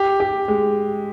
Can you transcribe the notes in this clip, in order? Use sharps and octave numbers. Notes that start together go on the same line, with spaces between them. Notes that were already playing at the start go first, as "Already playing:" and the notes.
Already playing: G4
G4
G#3